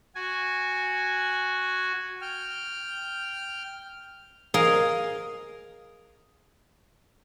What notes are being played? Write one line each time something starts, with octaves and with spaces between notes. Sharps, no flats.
F#4 G#5
G5 F6
G#4 A#4 D#5 F5